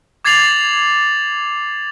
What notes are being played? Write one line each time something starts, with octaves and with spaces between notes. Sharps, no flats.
D6 G#6 A6 C7 F7 F#7